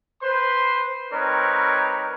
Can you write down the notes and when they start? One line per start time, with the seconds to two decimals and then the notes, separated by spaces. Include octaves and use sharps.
0.22 B4 C5 C6
1.12 G3 C4 D#4 A#4 B4 C#5